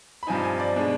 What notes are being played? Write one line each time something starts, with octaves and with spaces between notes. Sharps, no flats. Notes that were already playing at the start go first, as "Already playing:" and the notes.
B5
G2 F3 C4 D#4 G#5
G#5
D5
B2 G#3 D4